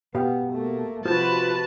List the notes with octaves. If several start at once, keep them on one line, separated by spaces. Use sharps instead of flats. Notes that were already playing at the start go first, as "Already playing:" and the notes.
B2 B3 G4 F5
A3 A#3
C3 F3 F4 F#4 B4 C5 F5 A5